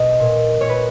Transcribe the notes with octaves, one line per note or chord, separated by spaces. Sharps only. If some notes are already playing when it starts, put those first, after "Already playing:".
Already playing: B2 D#5
A#2
A#2 C#5
B4